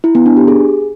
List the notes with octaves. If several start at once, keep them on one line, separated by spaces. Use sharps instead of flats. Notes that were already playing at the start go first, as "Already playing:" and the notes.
E4
B3
D4
G4
G#4